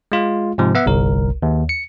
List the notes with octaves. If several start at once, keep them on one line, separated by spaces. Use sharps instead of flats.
G#3 F4
G#2 C3 F3
B3 E5 F#5
G1 C2 A#4
D#2
C#7